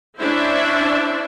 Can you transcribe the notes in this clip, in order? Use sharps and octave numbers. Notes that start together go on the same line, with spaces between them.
C#4 D4 E4 C5 E5